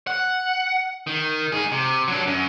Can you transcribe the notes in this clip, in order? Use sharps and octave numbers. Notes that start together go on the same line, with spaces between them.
F#5
D#3
D#4 G#4
C3
F#3 D4
F#2